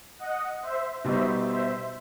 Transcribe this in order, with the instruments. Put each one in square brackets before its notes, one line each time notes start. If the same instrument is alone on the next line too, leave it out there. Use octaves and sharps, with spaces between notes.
[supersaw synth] D#5 F#5
C5 E5
[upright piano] B2 G3 D#4 [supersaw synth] C5 E5
[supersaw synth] C5 E5